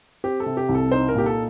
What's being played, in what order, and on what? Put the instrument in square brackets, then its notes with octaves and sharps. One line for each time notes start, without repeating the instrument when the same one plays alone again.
[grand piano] C4 [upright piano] G4
[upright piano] A4
[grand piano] C3
[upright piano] G4
[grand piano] C2
[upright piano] A4
[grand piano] D#4 [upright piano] C5
[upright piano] A#4
[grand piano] A#2 [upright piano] G4
[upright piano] A4